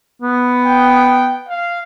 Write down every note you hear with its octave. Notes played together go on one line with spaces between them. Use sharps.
B3
G5
F5